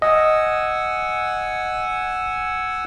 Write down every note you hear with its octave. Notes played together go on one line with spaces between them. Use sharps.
D#5 F#5 G#5 E6